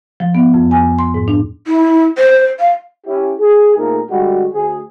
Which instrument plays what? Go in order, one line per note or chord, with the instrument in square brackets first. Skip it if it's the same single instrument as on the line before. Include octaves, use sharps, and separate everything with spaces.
[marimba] F3
B3
F2
G#5
C6
G#2
D4
[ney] E4
C5
F5
[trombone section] C#4 E4 G4
G#4
F2 A#2 A3 D#4 G#4 A#4
D3 G3 G#3 F#4
D2 G#4